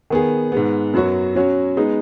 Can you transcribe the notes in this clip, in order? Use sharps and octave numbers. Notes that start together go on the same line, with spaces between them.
D#3 B3 G#4
G#2 G#3 B3
F#2 F#3 B3 F#4 C#5
F#3 C#4 F#4 C#5
G#3 B3 D#4